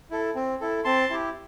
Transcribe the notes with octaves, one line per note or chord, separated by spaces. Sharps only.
E4 A4
C4
E4 A4
C4 A5 C6
E4 G4